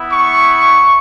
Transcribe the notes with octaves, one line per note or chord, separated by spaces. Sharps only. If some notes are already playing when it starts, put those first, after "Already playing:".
Already playing: B3 E4
C#6